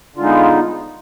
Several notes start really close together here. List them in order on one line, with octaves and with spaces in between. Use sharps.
D3 F4 G#3 D#4 B3